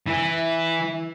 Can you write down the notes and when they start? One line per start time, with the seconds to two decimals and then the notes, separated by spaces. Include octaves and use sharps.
0.07 E3